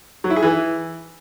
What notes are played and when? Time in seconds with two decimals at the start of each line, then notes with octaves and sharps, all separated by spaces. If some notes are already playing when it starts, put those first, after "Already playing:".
0.24 F#3
0.30 E4
0.36 G#4
0.43 E3